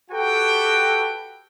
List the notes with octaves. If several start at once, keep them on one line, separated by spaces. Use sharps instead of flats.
F#4 G4 A4 B4 G5